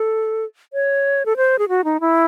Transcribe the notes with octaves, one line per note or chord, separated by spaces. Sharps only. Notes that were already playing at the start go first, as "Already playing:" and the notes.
Already playing: A4
C#5
A4
C5
G#4
F#4
D#4
E4